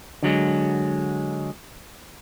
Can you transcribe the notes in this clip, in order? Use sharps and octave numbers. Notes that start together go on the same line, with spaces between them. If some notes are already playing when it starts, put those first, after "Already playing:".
D3 F#3 G#3